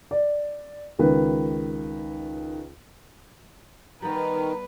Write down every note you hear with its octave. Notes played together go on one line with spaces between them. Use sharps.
D5
C#2 D#3 B4
D#3 G3 B3 B4 A#5